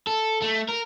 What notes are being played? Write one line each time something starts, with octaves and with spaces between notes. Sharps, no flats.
A4
A3
A#4